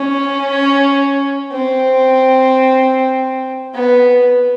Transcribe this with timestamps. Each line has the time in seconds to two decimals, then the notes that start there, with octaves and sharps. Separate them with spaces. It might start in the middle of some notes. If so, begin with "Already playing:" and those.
Already playing: C#4
1.52 C4
3.74 B3